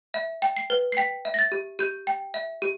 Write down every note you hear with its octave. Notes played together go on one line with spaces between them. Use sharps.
E5
G5
C7
B4
C7
G5 B6
E5
A#6
A6
G4
G4 G6
G5
E5
G4